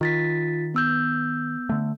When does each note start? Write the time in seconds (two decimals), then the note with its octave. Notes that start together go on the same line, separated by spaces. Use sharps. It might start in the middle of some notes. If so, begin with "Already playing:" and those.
0.01 D#3 F4 A6 B6
0.74 B3 E6 G6
1.69 D3 A3